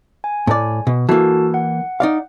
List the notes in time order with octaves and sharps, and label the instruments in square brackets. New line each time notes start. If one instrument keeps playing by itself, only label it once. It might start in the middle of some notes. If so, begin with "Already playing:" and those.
[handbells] G#5
[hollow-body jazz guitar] A2 D5
B2
[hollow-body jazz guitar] E3 A#3 [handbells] F#4 A4 A5
[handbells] F#5
[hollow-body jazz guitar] D#4 D5 F5